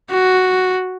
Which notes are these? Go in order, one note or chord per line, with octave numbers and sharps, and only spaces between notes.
F#4